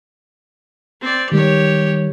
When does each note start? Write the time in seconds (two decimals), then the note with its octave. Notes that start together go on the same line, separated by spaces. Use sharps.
1.01 C4 D5
1.32 D#3 G3 G4 C#5